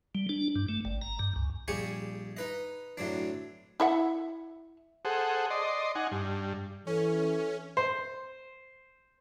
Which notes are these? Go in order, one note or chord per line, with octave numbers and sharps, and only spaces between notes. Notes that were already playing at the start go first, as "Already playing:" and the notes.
G3
D4
G2
A3
G1
A#5
G2
C#2
A#1 G3 G4 G#4 G#5 C#6
D#4 B4 D#5
A2 F#3 C4 D4
E4 E5 F#5
G#4 A4 C5 F#5
D5 D#5 C6
D#4 F#5 G#5
G2
E3 C#4 A4
C5